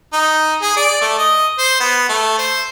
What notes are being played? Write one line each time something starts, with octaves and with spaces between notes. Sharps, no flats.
D#4
G#4
D5
A3
D#5
C5
B3
A3
C5